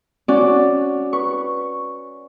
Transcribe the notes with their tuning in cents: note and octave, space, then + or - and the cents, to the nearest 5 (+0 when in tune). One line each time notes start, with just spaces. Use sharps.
C#4 +0 F#4 +0 D5 +0
B4 +0 C#6 +0